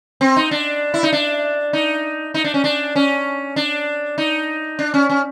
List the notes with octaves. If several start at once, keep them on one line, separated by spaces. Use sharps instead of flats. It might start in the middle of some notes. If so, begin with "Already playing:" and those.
C4
D#4
D4
E4
D#4
D4
D#4
D#4
D4
C#4
D4
C#4
D4
D#4
D4
C#4
C#4